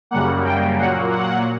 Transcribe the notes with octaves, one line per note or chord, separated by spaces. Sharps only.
F#2 C#3 G3 A#3 F#5
G5
A#2 F#3 A#3 F#5
F#5